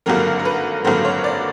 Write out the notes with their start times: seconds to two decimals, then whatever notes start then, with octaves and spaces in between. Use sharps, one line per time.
0.06 G#1 G2 D3 F#3 A#3 A#4
0.39 A#4
0.45 B4
0.84 G#1 G2 D3 F#3 A#3 C5
1.05 C#5
1.24 D5